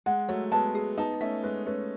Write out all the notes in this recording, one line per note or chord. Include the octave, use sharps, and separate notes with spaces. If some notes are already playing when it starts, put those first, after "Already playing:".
G#3 F#5
F#3 A3 C#5
G#3 B3 A5
G#4
B3 D#4 A5
A3 C#4 E5
G#3 B3 B4
A3 C#4 B4